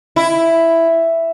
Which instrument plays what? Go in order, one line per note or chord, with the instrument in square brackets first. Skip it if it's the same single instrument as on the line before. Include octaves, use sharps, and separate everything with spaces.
[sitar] E4